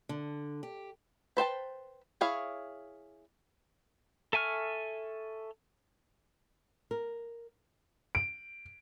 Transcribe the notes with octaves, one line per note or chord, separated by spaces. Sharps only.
D3
G4
B4 C5 G5 A5
E4 G#4 C#5 F5
A4 E5 G#5 C#6 F6
A#4
D7